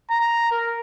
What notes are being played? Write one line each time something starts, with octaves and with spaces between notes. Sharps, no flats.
A#5
A#4